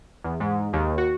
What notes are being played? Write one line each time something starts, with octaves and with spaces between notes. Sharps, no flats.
E2
G#2
D#2
F#4